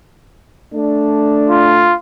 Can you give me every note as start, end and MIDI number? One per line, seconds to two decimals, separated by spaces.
0.73 1.94 57
0.73 1.94 62
1.50 1.93 65